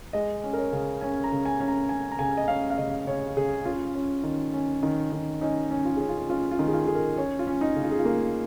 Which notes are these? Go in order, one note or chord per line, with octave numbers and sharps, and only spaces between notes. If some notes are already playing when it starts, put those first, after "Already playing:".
G#3 D#5
C#4
A#4
C#5
C#3
C#4 G#5
A#5
C#3
G#5
C#4
A#5
C#4 G#5
A#5
C#3 G#5
D#5
C#4 F5
F5
C#3 D#5
C#3 C#5
C#3 G#4
C#4 F4
C#4
D#3
C#4
D#3
D#3
C#4 D#4
C#4
F4
C#4 G#4
F4
C#4 F4
F4
D#3
G#4
F4
D#3 G#4
A#4
C#4 C#5
F4
C#4
D#4
C#3
F4
G#4
F4
A#3